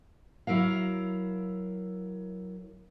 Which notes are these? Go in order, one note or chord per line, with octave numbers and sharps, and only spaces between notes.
F#3 E4 A#4 F5